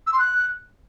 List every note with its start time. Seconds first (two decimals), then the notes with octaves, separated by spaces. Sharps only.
0.06 E6
0.12 C6
0.18 F#6